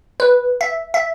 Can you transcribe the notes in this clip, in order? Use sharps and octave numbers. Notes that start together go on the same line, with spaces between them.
B4
E5
E5